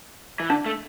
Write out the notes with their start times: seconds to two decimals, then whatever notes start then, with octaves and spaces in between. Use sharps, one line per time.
0.40 E3
0.49 D3 D4
0.66 A3